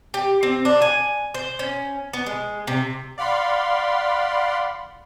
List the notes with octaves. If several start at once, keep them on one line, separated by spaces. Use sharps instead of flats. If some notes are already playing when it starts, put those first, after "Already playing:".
G4
C4
D4
G#5
C5
C#4
B3
G#3
C3
D5 F5 F#5 B5 C6